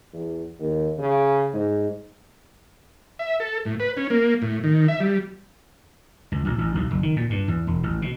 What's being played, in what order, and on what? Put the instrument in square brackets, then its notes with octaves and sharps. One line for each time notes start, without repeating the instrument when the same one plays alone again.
[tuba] E2
D#2
C#3
G#2
[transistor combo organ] E5
A4
A2
B4
C#4
A#3
A2
D#3
E5
G3
[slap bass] C#2
A#1
A1
B1
F#1
D#3
A#2
G2
E2
E1
A1
B2